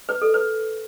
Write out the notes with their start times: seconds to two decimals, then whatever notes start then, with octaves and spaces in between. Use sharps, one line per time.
0.09 B4
0.22 A4
0.34 B4